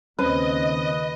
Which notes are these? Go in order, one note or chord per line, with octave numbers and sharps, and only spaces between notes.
D#2 C#3 C4 C#4 B4 D#5